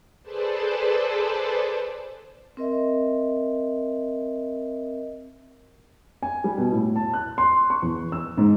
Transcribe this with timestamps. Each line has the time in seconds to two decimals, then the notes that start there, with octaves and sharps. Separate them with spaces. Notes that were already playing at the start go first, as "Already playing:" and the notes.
0.22 G#4 A4 B4 C5 D5 A5
2.57 C4 A#4 D#5 E5
6.23 G#5
6.44 G3
6.58 B2
6.72 A2
6.96 A5
7.14 F#6
7.38 C6
7.70 C#6
7.82 E2
8.12 E6
8.38 G#2